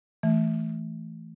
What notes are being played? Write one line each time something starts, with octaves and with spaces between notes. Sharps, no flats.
E3 A3